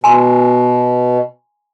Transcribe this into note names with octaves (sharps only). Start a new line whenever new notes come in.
B2 G#5 A#5 C6